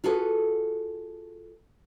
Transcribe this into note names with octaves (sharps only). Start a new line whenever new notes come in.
F4 F#4 G#4 A4 B4